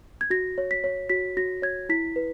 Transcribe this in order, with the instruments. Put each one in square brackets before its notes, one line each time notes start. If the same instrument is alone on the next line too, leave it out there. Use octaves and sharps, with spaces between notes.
[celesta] G#6
F#4 A#6
C#5
B6
C#5
F#4 B6
F#4 A#6
C#5 G#6
E4 B6
B4